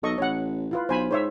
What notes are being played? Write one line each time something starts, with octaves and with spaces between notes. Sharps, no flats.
B1 A4 D#5 C#6
A1 C#5 F#5
E4 F4 B4
B1 C5 G#5 B5
G#2 C5 C#5 E5